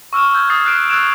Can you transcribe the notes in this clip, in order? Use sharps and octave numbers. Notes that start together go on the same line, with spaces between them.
C#6 E6 F6 E7
G6 G#6
D#6 A6 C7
F6 F#6 C7 D7 E7
E6 F#6 G#6 D7 E7 F7